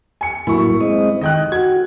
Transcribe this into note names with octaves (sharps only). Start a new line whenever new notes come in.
G#5 C#7
A2 F#3 A#3 E4 C#6
G#3 C4 D#5
D#3 D#5 G5 F#6
F#4 G#6